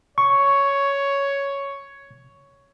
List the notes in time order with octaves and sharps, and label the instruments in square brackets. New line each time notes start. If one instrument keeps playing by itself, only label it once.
[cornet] C#5 [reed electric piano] C#6